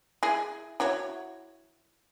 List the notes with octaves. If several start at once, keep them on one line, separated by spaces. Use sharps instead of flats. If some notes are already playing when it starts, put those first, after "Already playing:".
E4 G#4
E4 F#4 C#5